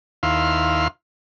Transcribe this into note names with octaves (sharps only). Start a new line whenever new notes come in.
D#2 E4 F5 C6